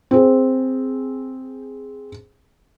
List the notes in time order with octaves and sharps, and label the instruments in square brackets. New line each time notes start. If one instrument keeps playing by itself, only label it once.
[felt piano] C4 G#4